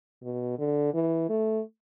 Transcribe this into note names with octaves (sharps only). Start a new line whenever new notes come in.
B2
D3
E3
A3